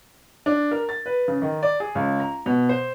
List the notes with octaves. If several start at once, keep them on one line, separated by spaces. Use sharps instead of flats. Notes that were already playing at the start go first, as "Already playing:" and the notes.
D4
A#4
A6
B4
C#3
D#3
D5
G#4
C#2
A#5
B2
C5